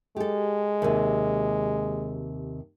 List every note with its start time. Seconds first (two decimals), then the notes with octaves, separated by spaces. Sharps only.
0.16 G#3 G4 A4
0.82 D#2 C3